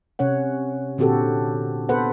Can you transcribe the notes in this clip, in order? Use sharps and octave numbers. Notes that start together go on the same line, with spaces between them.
C3 C#4 C#5 F#5
A#2 D3 C4 F#4 G4 A4
B3 A4 B4 C5 F#5